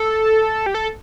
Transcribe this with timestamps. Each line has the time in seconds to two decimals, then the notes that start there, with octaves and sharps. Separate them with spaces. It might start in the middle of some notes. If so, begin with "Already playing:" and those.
Already playing: A4
0.66 G4
0.74 A4